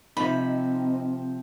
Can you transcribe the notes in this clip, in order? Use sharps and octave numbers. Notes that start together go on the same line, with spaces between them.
C3 F3 C4 D#4 B5